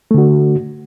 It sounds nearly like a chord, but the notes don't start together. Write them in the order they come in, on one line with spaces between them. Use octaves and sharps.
A3 D3 F#4